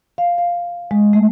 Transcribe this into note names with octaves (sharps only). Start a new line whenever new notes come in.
F5
F5
G#3
A3